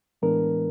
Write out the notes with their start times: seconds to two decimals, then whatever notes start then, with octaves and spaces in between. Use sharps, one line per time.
0.22 A2 E3 G#3 B3 D4 A#4